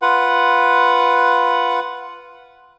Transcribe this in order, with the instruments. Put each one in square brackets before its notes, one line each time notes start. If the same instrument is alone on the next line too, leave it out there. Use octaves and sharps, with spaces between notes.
[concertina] F4 B4 F#5